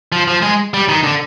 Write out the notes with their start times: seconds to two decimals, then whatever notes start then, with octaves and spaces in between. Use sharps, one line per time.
0.12 F3
0.27 F3
0.42 G#3
0.74 G3
0.88 D#3
1.03 D3